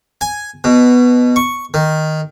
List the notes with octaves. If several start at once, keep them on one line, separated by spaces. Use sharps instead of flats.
G#5
B2
C#6
D#3